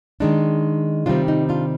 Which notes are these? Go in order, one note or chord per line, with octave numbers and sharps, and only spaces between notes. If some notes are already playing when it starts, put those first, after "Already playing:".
D#3 G#3 D4 D#4
C3 D#3 G3 C4 D4 F4
D#4
D4 F4